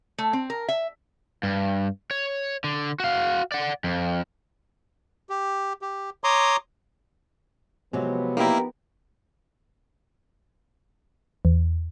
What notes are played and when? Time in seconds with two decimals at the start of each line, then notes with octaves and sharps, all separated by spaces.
0.18 A3
0.33 C4
0.50 A#4
0.68 E5
1.43 G2
2.11 C#5
2.64 D3
3.00 F#4 F5
3.52 D5 F#5
3.84 F2
5.29 G4
5.82 G4
6.24 C#5 A#5 C6 D6 D#6
7.93 C3 F3 F#3 G#3 B3
8.37 A#3 D#4 E4 G4 A#4
11.45 E2